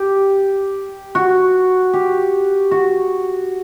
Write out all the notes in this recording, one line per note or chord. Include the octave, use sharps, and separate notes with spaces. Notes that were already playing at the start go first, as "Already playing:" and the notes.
Already playing: G4
F#4
G4
F#4